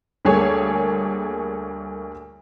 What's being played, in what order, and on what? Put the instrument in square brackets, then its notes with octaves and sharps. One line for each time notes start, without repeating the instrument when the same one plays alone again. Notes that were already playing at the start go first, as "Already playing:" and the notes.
[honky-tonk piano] D2 G3 A#3 G#4 A4 C#5